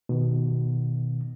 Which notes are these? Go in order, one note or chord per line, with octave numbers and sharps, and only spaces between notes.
B2 D#3